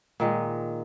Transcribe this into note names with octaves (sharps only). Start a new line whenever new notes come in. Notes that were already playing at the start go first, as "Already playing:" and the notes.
A#2 D#3 G#3